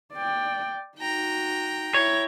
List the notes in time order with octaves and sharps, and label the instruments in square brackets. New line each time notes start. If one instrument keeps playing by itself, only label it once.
[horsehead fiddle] D5 G5
[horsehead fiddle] D#4 F#4 [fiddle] G5 A#5
[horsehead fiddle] E4 [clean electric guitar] C#5